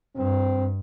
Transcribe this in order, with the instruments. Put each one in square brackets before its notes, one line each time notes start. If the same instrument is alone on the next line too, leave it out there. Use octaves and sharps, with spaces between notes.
[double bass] G2 [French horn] C4